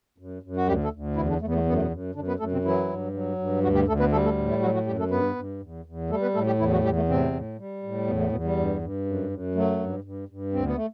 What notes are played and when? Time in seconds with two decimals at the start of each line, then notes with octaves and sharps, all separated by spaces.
0.18 F#2
0.42 F#2
0.56 F#4
0.67 D2 G3 G4
0.84 A3 A4
0.92 D2
1.16 E2 E3 E4
1.28 D3 D4
1.41 E2 A3
1.49 B3
1.54 A3
1.66 F#2 B3
1.73 A3
1.81 B2 B3
1.90 F#2
2.15 F#2 D3 D4
2.27 B3 B4
2.39 F#2 A3 A4
2.52 C3 C4
2.64 E3 F#3 E4
2.89 G2
3.13 F#3
3.39 G2
3.63 D2 F#3 F#4
3.75 G3 G4
3.87 D2 A3 A4
3.99 B3 B4
4.12 G3 A3 A4
4.24 A3 A4
4.37 A2
4.49 E3 E4
4.62 F#3 F#4
4.74 F#3 F#4
4.86 F#2 G3 G4
4.99 A3 A4
5.11 G2 B3 B4
5.36 G2
5.61 E2
5.85 E2
6.10 G3 A3 A4
6.22 B3 B4
6.34 A2 A3 A4
6.46 G3 G4
6.58 E2 E3 E4
6.71 F#3 F#4
6.84 E2 G3 G4
6.96 A3
7.08 A2 C3 C4
7.32 A2
7.58 G3
7.83 A2
8.07 E2 B2 B3
8.20 A3
8.31 E2 B2 B3
8.44 G3
8.56 G2
8.81 G2
9.06 F#2
9.30 F#2
9.55 F#3 A3
9.80 G2
10.04 G2
10.29 G2
10.53 D2 C4
10.65 B3
10.75 A3